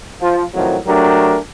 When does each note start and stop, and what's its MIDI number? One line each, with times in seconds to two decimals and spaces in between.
0.22 0.43 53
0.22 0.43 65
0.54 0.77 41
0.54 0.77 45
0.54 0.77 51
0.54 0.77 53
0.54 0.77 54
0.87 1.38 54
0.87 1.38 57
0.87 1.38 62
0.87 1.38 67
0.87 1.38 70